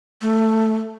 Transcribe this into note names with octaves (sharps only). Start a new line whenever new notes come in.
A3